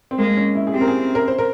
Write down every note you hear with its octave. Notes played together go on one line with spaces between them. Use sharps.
C4
G#3 A#3
C#4
E4
G#4
C4 G4
A#4
G#4
A#4
C5
A#4